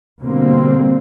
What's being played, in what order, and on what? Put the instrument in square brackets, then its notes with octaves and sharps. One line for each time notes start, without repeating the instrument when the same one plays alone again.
[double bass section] B2 D3 G3 A#3 C4